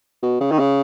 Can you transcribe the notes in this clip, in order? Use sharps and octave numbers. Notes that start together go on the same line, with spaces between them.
B2
C#3
D#3
C#3